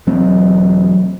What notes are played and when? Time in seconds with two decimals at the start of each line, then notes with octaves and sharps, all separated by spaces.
0.07 E1 F#3 C4